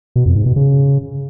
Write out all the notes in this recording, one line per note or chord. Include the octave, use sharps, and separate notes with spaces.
B2
F2
G#2
B2
C#3